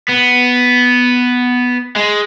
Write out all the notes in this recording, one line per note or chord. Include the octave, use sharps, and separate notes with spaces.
B3
G#3